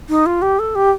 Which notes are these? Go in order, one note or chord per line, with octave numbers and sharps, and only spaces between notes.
D#4
F4
G4
A4
G4